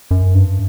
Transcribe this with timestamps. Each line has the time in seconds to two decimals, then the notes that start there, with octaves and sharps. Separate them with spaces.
0.11 F#2
0.34 G2